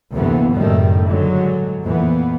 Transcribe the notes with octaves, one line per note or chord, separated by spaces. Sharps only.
D2 G2 C3 E3 A#3 B3
F#1 F#2 A2 D#3 G3 A3
G2 D3 F#3 G#3
F2 A#2 E3 B3